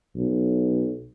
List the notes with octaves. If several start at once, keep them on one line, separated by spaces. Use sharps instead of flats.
B1